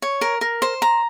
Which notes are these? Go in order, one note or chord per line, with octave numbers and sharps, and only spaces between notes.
C#5
A#4
A#4
C5
A#5